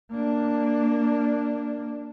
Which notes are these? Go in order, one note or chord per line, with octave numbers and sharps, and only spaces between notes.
A#3 D4